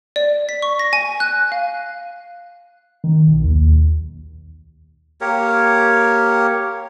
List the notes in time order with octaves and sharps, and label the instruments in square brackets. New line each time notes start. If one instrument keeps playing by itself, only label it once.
[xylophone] D5
B6
C#6
A#6
G#5
F#6
F5
[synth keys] D#3
B1
D#2
[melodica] A#3 G4 A#4 C#5